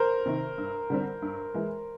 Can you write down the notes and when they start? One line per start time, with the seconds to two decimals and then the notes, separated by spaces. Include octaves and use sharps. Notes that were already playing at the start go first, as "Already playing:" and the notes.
Already playing: A#4 C5
0.26 C3 D#3
0.58 G2
0.90 D3 G3 C4
1.22 G2
1.54 E3 G#3